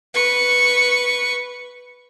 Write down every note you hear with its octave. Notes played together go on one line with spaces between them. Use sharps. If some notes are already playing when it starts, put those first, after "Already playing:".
B4 C#6